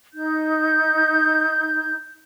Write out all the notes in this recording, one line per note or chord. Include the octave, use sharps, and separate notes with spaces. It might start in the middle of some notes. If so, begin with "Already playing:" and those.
D#4 G6